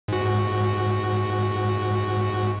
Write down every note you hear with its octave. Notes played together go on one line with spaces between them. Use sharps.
G#2 F#4